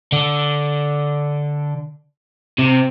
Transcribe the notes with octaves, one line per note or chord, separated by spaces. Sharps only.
D3
C3